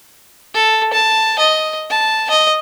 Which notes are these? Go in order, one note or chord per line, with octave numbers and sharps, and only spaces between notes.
A4
A5
D#5
A5
D#5